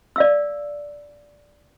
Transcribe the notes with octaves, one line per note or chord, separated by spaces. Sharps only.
D5 F5 E6